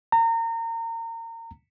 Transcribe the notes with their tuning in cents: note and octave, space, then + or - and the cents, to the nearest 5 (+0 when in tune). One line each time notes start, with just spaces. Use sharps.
A#5 -30